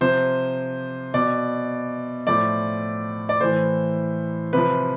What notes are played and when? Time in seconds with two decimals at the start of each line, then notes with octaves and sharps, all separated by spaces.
0.01 C3 F3 C5
1.14 B2 D5
2.27 A2 F3 D5
3.29 D5
3.41 A2 E3 C5
4.53 C3 F3 B4